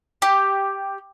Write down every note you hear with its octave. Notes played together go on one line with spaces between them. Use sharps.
G4